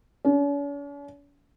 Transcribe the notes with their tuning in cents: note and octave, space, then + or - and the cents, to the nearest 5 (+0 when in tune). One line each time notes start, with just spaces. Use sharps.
C#4 +45